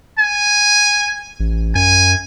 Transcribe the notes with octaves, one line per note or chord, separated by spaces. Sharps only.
G#5
A1
F#2 G#5